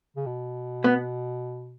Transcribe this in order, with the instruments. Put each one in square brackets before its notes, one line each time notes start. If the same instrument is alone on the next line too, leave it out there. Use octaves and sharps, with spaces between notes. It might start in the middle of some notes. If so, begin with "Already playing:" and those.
[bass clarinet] C#3
B2
[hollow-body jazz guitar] B3